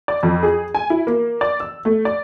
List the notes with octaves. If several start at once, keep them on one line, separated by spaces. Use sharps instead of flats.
D5
F2
G#4
G#5
E4
A#3
D5
E6
A3
D5